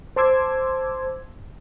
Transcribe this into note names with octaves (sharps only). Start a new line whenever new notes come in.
C5 A5 C6 D6 E6 G#6